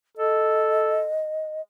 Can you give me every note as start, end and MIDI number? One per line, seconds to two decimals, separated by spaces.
0.17 1.08 69
0.17 1.61 75